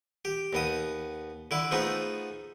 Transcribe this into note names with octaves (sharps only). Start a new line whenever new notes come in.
G4
D#2 B3 D#6
D3 E4 D6
F3 A3 B3 D#4 G#4